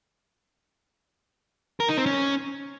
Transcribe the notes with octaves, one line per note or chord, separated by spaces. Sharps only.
A#4
D#4
C4
C#4